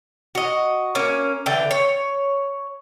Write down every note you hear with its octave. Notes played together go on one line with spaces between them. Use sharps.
F#4 D#5
A#3 C#4
D3 E3 G5
C#5